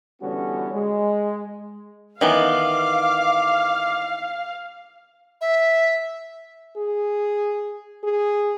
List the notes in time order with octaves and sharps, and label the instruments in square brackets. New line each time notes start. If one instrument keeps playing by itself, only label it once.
[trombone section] D3 E3 G3 B3 C#4 F#4
G#3
[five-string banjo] D#3 E3 B3 [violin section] F5 [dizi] D6
[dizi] E5
[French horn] G#4
G#4